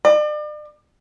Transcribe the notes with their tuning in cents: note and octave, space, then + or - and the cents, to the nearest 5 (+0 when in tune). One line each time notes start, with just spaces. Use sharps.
D5 +40